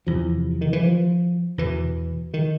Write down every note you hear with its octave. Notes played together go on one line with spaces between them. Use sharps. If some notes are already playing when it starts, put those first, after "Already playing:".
E2 C3 F3
D#3
E3
F3
E2 B2 E3
D#3